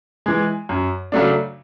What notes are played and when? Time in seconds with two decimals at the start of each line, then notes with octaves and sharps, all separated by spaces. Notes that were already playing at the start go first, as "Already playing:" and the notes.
0.26 E3 G#3
0.69 F#2
1.12 C#3 F#3 A3 D4